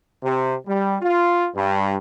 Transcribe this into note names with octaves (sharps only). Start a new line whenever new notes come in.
C3
G3
F4
G2